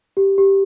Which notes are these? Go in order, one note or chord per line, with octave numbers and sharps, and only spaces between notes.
G4
G4